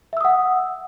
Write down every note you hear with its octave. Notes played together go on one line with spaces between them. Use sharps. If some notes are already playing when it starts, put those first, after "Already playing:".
E5 F#5 D#6 E6